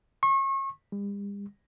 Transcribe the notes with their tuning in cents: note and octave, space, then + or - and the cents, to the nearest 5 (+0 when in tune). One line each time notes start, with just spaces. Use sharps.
C#6 -35
G3 +45